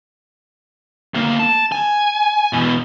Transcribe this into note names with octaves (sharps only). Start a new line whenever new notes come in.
D2 A#3
A5
G#5
E2 B2